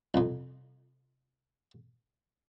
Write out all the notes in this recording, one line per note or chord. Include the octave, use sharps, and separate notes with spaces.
C2 F2